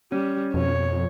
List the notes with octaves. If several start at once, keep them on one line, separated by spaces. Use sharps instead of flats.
G3 C#4
F2 B2 C#5